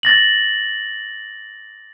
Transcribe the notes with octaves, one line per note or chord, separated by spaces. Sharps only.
A6 A#6 F#7